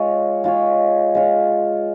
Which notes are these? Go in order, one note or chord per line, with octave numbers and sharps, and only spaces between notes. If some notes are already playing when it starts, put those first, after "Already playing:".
Already playing: G#3 F4 C#5
G#3 F4 C#5
G#3 F4 C#5